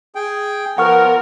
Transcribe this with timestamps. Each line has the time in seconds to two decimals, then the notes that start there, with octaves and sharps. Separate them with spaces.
0.15 G#4 G5
0.78 F3 B3 A#4 F#5 C#6 F6